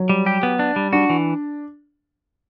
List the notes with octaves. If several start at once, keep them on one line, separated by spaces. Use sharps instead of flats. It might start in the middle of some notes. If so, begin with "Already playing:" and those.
Already playing: F#3
G3
G4
B3
D4
G3
D4 F#4
E3